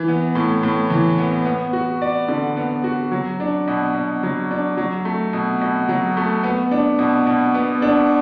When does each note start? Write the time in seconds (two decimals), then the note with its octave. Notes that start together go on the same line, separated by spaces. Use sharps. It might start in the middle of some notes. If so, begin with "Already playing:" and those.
Already playing: E3
0.08 B3
0.35 A2
0.63 A2
0.90 E3
1.18 B3
1.45 B3
1.73 F#4
2.02 D5
2.28 D3
2.57 B3
2.84 F#4
3.12 F#3
3.40 D4
3.68 B2
3.95 B2
4.23 F#3
4.51 D4
4.77 F#3
5.05 A3
5.33 B2
5.61 B2
5.89 F#3
6.17 A3
6.43 B3
6.71 D4
6.99 B2
7.27 B2
7.54 B3
7.82 D4